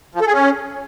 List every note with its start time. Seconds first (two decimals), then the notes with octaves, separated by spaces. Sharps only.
0.15 F3
0.21 A4
0.27 G#4
0.33 C#4